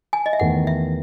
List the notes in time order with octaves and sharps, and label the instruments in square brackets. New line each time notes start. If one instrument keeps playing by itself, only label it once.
[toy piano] G#5
D#5
E5
[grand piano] E2 D#3 A3 [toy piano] F#5
[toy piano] E5